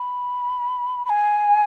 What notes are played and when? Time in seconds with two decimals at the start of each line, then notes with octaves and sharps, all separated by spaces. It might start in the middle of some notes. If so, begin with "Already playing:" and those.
Already playing: B5
1.05 B5
1.09 G#5